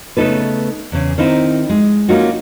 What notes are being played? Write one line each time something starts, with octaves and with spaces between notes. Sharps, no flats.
C#3 A3 B3 D#4 A4 B4
E2 C#3
D#3 C4 D#4 E4
G#3
A#3 C#4 D#4 F4 F#4